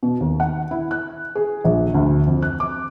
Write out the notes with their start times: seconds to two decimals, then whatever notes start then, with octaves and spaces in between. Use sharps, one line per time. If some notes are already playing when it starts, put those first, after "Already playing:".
0.03 B2
0.20 D#2
0.40 F#5
0.71 E4
0.91 F#6
1.35 G#4
1.65 A#1
1.94 D2
2.27 F2
2.42 F#6
2.60 D6